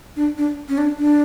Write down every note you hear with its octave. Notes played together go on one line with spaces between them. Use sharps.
D4
D4
C#4
D4
D4